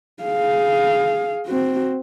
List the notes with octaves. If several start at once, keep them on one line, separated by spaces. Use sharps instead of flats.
G#4 F5
C4 F#4